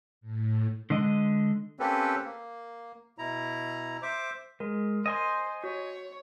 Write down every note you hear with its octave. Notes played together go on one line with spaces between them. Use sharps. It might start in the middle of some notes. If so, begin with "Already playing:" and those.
A2
D3 G#3 D#5
A#3 C4 C#4 G4 A4 B4
A#3
B2 E4 A#5
C5 E5 D6
G#3 A#4
C5 D#5 G#5 C6
F#4 C#5